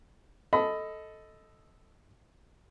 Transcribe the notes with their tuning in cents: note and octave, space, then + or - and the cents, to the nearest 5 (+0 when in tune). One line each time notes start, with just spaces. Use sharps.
A4 +0 D#5 +10 B5 +25